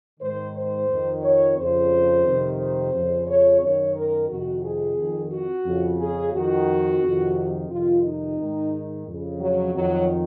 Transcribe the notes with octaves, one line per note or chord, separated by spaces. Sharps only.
G#2 D#3 C5
C5
F2 D#3
C#5
F2 C#3 C5
F2 C3 D#3
C5
F2 C#3
C#5
F#2 D#3 C#5
A#4
F2 C3 D#3 F#4
G#4
F2 D#3
F#4
F2 C#3
G#4
F2 D#3 F#4
F2 C3 D#3
F2 C3 D#3 F4
D#4
G#2 D#3
F2 C#3
F#3
F2 D#3 F#3